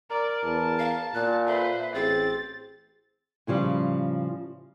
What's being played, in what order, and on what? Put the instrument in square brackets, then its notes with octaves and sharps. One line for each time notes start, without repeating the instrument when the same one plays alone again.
[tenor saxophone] A#4 [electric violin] D5 [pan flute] A#5
[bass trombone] E2 [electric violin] A5
[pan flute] F5
[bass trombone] A#2 [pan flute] F#6
[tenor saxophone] A4 [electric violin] B4 C5 [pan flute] E5
[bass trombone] A1 [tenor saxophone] C4 [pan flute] G#4 [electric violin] A6
[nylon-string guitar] A2 C#3 F3 G3